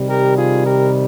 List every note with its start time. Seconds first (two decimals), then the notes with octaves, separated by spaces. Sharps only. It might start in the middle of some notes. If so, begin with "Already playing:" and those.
Already playing: C3 D#3 G3
0.09 G4 A#4
0.38 F4 G#4
0.66 G4 A#4